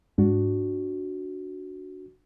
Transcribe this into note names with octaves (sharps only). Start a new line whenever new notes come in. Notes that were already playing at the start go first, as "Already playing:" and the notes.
G#2 D4 F#4